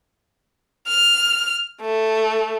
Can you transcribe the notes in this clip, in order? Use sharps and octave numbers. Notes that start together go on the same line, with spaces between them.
F6
A3